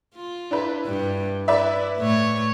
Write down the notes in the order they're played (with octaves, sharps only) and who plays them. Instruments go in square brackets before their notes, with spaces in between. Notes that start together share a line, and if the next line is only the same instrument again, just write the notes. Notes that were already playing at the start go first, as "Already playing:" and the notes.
[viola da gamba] F4
[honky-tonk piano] D4 E4 B4
[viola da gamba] G2 G3
[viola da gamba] E4 [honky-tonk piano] B4 D5 E5
[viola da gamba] A2 A3 C#5